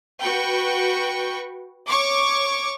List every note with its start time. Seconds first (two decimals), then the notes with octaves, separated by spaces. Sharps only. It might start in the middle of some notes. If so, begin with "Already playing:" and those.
0.20 F#4 B4 G5 C#6
1.88 C#5 C#6 D6